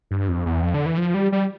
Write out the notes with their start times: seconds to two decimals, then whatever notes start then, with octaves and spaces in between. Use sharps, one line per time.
0.11 G2
0.29 F2
0.46 E2
0.62 F2
0.74 D3
0.86 E3
0.98 F3
1.14 G3
1.32 G3